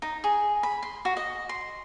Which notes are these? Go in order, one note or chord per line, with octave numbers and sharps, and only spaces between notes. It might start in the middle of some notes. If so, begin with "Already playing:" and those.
D#4
G#4
B5
C6
F#4
D#5
C6